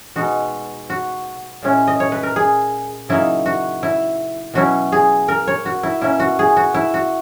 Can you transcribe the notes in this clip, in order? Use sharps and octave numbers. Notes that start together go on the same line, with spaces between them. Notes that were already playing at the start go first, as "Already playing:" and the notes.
B2 G#3 D#4 F#4
F#4
A#2 G#3 C#4 E4
D#5
C#5
B4
A#4
G#4
C#3 F#3 A#3 D#4 E4
F#4
E4
B2 F#3 C#4 E4 F#4
G#4
A#4
C#5
F#4
E4
B2 A#3 C#4 E4
F#4
G#4
F#4
E4
F#4